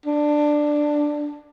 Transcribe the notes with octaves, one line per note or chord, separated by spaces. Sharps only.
D4